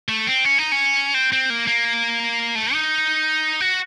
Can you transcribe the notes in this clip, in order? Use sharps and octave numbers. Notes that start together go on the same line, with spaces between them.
A3
C4
C#4
D#4
C#4
C4
C4
A#3
A#3
A3
D#4
F#4